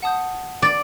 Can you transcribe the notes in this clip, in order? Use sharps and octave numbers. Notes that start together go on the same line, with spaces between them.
F#5 A5 D#6 G6
D5